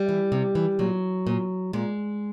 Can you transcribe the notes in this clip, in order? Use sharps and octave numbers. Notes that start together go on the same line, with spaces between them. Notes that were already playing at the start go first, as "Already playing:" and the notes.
Already playing: G3
E3
C3
E3
A#2 F#3
A#2
A#2 G#3